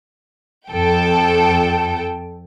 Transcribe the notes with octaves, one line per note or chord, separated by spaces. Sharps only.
F2 A4 G5